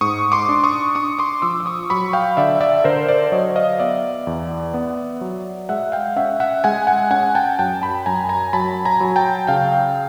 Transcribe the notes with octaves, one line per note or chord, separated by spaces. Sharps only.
G#2 C#6 D#6
C6 D6
D4
C#6 D#6
D4 C#6 D#6
C6 D6
F3 D6 E6
D6
C#6 D#6
F#3 B5 C#6
F5 G5
D3 D5 E5
D5 E5
D3 A#4 C5
C5 D5
F#3 C#5 D#5
D#5 F5
B3 D5 E5
E2
B3
F#3
G#3 E5 F#5
F5 G5
C#4 E5 F#5
E5 F#5
G#3 F#5 G#5
F#5 G#5
C#4 F#5 G#5
G5 A5
F#2 G5 A5
A5 B5
F#2 G#5 A#5
G#5 A#5
F#3 A5 B5
G#5 A#5
F#3
G5 A5
C#3 F5 G5